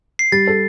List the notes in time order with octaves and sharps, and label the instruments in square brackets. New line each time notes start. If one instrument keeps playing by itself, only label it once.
[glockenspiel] C7
[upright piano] G3 [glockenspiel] A6
[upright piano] A4